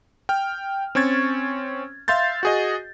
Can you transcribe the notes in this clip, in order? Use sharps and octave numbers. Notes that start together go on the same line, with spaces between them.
G5 F6
C4 C#4 C#6 G#6 A6
E5 F5 C6 G6 A6
F#4 G#4 D#5